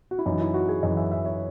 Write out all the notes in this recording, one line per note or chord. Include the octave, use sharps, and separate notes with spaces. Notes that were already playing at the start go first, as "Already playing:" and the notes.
F#4
E4
F#2 E3 D#4
E4
F#4
G#4
F#2 E3 D#5
E5
E5
C#5